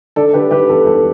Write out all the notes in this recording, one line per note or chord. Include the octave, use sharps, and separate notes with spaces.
D3 A4 D5
D3 G4 B4
D3 G4 B4
E2 A4
E2 A4